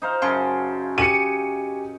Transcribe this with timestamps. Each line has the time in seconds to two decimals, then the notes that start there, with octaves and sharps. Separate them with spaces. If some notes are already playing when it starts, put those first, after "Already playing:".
0.02 D#4 C5 F5
0.22 F#2 C#3 F5 A5 C6
0.98 G4 G#5 C#7 D#7